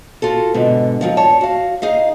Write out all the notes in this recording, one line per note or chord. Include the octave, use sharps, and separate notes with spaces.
F4 F#4 A4
G#2 B2 D3
D#3 F3 F#3 D#4
G2 C#5 A5
F#4 F5
D#4 G#4 F5